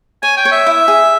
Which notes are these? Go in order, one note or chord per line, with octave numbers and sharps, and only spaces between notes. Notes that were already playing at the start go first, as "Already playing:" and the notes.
C#5 G#5
G5
C#5
E5
E4
G#4